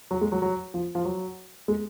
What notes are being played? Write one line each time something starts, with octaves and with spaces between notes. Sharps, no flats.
F#3
G#3
F#3
F#3
F3
F3
F#3
G#3